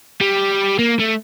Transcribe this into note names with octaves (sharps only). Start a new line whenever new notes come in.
G3
A#3
A3